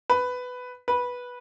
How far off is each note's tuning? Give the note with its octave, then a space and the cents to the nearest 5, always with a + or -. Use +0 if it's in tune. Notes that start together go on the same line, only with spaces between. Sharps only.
B4 +10
B4 -10